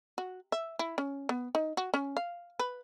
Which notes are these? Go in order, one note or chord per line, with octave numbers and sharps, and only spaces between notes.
F#4
E5
E4
C#4
B3
D#4
F#4
C#4
F5
B4